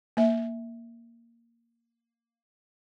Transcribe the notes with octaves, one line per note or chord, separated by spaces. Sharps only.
A#3 E5